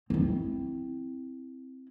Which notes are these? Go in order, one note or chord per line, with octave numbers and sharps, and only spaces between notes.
C4 E4